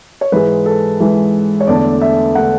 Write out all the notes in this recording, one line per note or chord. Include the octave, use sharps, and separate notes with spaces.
C#5
G#2 E3 G#3 B4
A4
G#2 E3 G#3
C#5
E2 D3 A3 D5
E5
D3 A3 F#5